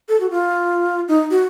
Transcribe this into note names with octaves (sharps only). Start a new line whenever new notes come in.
A4
F#4
F4
D#4
F#4